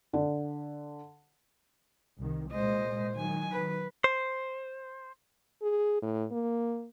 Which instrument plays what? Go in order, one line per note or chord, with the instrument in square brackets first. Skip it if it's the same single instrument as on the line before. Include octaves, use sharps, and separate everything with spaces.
[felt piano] D3
[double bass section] C2 D#3
[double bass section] A#2 G#3 [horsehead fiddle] C5 D#5
[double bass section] D#3 F#3 [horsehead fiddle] G#5
[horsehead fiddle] B4
[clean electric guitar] C5
[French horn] G#4
A2
A#3